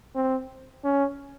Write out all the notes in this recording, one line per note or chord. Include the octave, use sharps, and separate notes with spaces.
C4
C#4